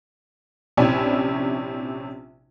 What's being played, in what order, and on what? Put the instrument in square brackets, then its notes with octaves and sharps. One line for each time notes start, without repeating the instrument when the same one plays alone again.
[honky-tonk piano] A#1 C3 C#4 D4 E4 G#5